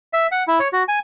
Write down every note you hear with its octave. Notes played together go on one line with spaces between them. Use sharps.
E5
F#5
E4
C#5
F#4
G#5